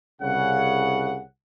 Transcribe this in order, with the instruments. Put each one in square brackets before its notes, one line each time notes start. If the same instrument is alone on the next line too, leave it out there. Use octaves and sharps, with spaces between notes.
[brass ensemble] C2 C#3 F#5